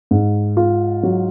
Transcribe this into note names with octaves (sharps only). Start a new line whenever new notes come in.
G#2
F4
F#3